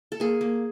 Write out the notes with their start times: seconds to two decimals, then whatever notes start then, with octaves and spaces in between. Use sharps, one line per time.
0.12 A4
0.20 A#3 G#4
0.41 A#3